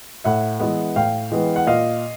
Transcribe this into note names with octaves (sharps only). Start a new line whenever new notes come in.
A2 E5 F#5
E3 G#3 B3
A2 F5 G5
E3 G#3 B3
F#5
A#2 D#5 F5